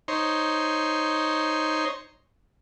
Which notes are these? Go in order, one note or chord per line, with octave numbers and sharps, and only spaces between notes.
D#4 C5 C#5